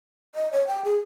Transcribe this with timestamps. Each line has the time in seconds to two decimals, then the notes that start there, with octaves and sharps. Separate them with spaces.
0.35 D#5
0.53 C#5
0.67 G5
0.85 G#4